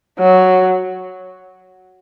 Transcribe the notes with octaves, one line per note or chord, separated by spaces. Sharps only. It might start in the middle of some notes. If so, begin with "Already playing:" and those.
F#3